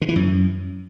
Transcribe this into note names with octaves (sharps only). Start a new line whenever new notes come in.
D3
E3
F#2